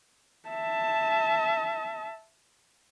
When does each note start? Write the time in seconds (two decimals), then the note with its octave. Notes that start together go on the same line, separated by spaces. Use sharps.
0.49 E5 A5